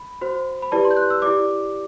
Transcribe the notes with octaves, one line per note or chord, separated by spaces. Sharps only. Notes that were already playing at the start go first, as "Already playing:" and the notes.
Already playing: B5
F#4 C5
B5
E4 G4 B4 D5 A5
C6
G6
F#6
E6
E4 G4 D5 D6